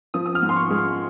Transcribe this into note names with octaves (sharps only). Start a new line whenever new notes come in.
F3 D#6
D#6
F6
G#2
C6
C#6
G#3
C6